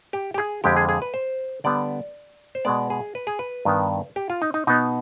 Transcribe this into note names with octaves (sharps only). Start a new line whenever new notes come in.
G4
G4
G#4
F2 D3 G#3 G4
G#4
G#4
B4
C5
D3 G3 B3 D5
C5
B2 G#3 B3 D5
G#4
B4
G#4
B4
G2 D#3 B3
G4
F4
D#4
D#4
B2 B3 D#4